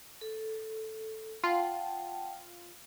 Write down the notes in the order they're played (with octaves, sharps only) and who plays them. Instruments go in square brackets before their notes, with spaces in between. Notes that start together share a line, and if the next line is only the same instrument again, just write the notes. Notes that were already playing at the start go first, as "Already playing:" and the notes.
[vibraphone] A4
[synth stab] F4 [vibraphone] F#5 G5 A5